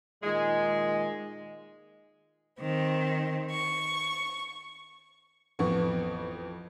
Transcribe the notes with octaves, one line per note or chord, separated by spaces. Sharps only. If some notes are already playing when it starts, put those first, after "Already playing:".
A#2 D#3 G#3
D#3 C4
C#6
A1 F2 B3 C#6